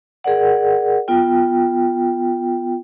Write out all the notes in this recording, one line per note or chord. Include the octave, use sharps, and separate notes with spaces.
G#4 A#4 D5 F#5
B3 F4 G5